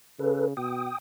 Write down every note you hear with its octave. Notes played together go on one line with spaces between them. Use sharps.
C#3 A4 B4
B2 G5 D#6